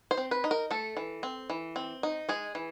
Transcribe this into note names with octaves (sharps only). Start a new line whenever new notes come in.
C5
C4
B4
D#4
A#4
A3 A4
E3
C4
E3
C4
D#4
G#3 G#4
E3